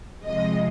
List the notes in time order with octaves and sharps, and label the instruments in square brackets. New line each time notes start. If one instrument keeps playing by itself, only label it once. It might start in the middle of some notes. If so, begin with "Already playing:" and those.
[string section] C3 F3 G#3 D#5